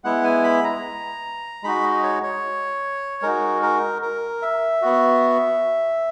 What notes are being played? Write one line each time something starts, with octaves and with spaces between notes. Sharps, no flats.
G#3 B3 E4 F#5
G#5
B5
A#5
G#3 D#4 F#4 B5
D#5
C#5
C#5
G#3 D#4 F#4 A#4
A#4
A#4
E5
B3 F#4